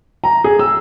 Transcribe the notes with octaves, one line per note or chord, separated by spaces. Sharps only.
A#5
G#4
E6